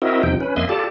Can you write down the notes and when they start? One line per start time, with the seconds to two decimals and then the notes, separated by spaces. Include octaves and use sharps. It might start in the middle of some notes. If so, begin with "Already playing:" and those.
0.02 C4 E4 F#4 A#4 D#5 E5
0.23 E2 C3 F3 D#4 G5
0.40 C#4 B4
0.56 F2 A#3 D#5 E5 G#5 C6
0.69 F4 G4 A4 D5 A5